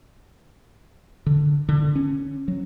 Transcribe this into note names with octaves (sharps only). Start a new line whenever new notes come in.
D3
D3
C#4
F#3